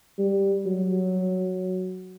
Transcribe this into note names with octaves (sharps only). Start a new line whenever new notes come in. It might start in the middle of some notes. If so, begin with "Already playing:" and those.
G3
F#3